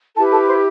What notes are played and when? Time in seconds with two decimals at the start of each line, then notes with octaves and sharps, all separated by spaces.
0.15 E4 G4 A4 B4 A5
0.31 A4 A5
0.47 C5 C6